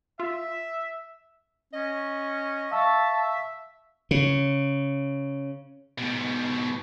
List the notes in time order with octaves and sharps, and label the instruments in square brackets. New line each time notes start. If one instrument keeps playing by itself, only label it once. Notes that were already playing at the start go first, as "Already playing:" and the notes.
[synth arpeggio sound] F4 [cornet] E5
[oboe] C#4 [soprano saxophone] D#5
[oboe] E5 [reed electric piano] F5 C#6 E6 [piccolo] A5
[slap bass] C#3
[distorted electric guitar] G#2 B2